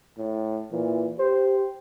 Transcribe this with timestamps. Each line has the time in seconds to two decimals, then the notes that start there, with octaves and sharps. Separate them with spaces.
0.18 A2
0.72 A#2 E3
1.19 G4 C5